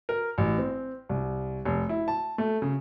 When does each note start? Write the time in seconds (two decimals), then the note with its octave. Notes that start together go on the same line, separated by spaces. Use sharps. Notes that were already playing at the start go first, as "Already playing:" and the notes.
0.09 A#4
0.38 A1
0.58 C4
1.09 C2
1.65 F1
1.89 E4
2.08 A5
2.38 A3
2.62 C#3